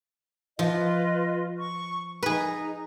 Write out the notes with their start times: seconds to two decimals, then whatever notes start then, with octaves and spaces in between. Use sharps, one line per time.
0.59 F3 F4 B4 D#5
1.57 C#6
2.23 D#4 G#4 B4